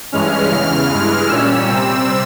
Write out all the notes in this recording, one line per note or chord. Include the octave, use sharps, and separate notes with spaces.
G2 E3 G#3 C#4 F6
E2 C#3 E3 F6
G2 E3 G#3
A#2 G3 C#4 E6
C3 G3 C4